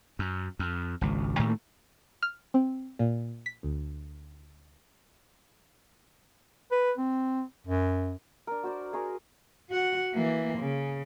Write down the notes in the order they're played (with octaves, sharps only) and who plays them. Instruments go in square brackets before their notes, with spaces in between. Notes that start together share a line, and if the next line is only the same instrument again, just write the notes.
[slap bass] F#2
F2
G#1 C#2
A2 D#3 A3 A#3
[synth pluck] F6
C4
A#2
B6
D2
[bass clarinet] B4
C4
F#2
[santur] D4 A#4
F#4 C5 D5
G#4 A#4 C#6
[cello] F#4 F#5
E3 A#3
C#3